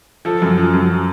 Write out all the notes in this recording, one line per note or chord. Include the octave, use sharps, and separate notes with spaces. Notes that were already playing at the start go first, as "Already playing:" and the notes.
F3 A4
F#2
F3
F#2